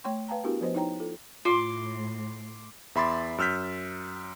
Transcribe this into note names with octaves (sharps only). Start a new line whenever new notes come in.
A3 C#5 G5 C6 C#6
B4 F5 G5 A5 A#5
B3 D4 E4 F#4 G4 A#4
F3 B3 B4 C5 D#5
D#4 E4 C#5 G5 A#5
F4 A4
A2 F4 C6 D6
E2 E5 B5 C6 D6 A6
F#2 E6 F6 G6 B6